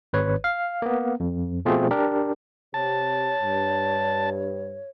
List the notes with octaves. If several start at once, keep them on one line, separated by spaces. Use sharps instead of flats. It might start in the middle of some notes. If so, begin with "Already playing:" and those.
G#1 B4 C#5
F5
A#3 B3
F2
B2 F3 A3 C4 F4 G#4
D4 G4 A#4
C3 G4 C#5 A5
G2